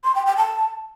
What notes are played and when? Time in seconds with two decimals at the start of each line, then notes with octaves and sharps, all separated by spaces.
0.04 C6
0.15 G5
0.26 G5
0.37 A5